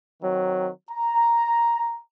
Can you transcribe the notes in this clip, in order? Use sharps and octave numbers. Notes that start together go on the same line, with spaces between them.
D#3 F#3 C4
A#5